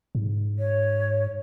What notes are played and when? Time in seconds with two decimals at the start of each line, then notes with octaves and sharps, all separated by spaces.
0.15 G#2
0.59 C#5